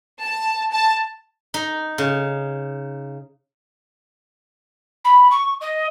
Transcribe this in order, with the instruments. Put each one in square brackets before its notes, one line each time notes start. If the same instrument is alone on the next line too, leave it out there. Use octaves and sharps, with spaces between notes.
[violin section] A5
A5
[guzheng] D#4
C#3
[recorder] B5
C#6
D#5